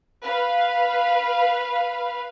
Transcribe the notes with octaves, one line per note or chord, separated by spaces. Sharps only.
B4 F5